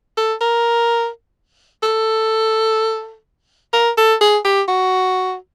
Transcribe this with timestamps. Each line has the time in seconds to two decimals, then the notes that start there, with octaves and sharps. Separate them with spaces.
0.17 A4
0.41 A#4
1.83 A4
3.73 A#4
3.97 A4
4.21 G#4
4.45 G4
4.68 F#4